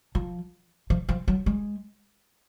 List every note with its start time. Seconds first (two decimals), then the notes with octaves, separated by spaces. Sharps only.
0.15 F3
0.90 F3
1.09 F3
1.28 F#3
1.46 G#3